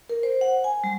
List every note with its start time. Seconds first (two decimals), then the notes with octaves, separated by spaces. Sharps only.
0.09 A#4
0.23 C5
0.41 F#5
0.64 G#5
0.84 G3